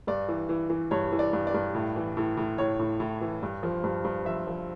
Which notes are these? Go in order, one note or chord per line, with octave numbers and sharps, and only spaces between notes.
G2 D5
E3
E3
E3
G2 C#5
E3
D5
G2
D5
G2
A2
E3
A2
A2
A2 C#5
A2
A2
E3
G2
F3
G2
G2
F3 E5
F3